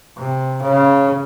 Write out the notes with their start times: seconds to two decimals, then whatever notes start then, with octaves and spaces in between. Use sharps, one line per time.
0.17 C3
0.62 C#3